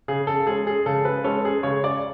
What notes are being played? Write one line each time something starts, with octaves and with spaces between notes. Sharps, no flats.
C#3 G#4
A4
G#3 C#4 G#4
G#4
C#3 A4
B4
G#3 C#4 A4
G#4
C#3 C#5
D5